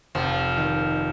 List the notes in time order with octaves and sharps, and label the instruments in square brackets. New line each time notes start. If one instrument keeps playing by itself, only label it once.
[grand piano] F1 [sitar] F3
[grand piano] D#3